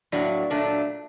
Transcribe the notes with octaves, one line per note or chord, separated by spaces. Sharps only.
A2 F#3 A#3 D4 F#4 D5
A#2 F#3 A3 D4